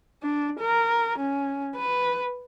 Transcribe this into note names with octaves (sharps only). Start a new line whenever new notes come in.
D4
A#4
C#4
B4